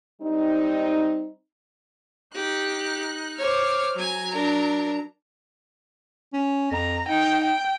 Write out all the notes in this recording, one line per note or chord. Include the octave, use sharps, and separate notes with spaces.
G3 C4 D#4
D#4 G4 F#6
C5 C#5 D6 F6
F#3 G#5 A#5
D4 A#4
C#4
F2 A#5
D#4 G5
G5